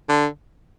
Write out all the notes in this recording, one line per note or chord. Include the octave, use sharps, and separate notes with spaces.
D3